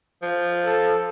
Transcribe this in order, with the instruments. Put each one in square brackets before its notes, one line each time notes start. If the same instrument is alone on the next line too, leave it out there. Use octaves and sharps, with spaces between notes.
[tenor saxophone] F3
[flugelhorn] A4